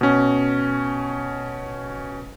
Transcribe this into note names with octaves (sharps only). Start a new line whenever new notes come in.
B2 C#4